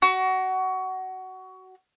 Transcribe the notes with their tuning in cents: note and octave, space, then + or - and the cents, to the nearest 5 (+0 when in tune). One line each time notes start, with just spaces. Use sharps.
F#4 +20